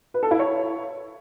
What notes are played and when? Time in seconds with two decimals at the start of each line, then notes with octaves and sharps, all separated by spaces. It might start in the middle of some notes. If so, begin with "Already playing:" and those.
0.14 B4
0.23 A4
0.31 E4
0.39 C#5